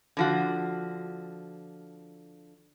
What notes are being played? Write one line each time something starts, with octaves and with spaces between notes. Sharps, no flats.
D3 F3 F#4